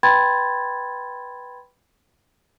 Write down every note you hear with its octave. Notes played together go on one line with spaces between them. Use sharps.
B4 G5 B5 C6 G#6 A6